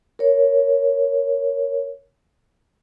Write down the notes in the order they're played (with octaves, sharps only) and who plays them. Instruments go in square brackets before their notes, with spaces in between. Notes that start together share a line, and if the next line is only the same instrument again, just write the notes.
[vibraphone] A#4 C#5